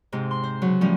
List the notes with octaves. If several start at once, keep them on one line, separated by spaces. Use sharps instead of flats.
G#2 C3
C6
C5
C#3 F#3
A2 F3 G3 C#4